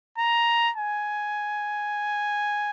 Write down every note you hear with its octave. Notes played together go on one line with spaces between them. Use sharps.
A#5
G#5